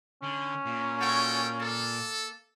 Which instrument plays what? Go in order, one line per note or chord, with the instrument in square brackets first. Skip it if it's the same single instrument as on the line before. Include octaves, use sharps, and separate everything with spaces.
[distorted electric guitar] D3 [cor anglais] C#4
[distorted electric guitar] A#2
[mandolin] F#4 C#5 G#5 [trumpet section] A4 G5
[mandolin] A#3 [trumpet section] A4